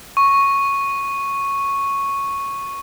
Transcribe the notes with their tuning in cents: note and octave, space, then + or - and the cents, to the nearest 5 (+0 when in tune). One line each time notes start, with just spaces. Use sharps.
C#6 -5